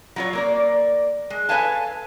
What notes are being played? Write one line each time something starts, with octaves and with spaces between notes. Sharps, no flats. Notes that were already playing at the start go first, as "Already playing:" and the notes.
F#3 F4 C#5
A#3 A#4 D5
G#3
A4 B4 C#5 F5 G#5 A5